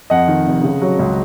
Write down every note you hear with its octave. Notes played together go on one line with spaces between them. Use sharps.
F2 D#5 F#5
D#3
F1
C#3
F#3
C#2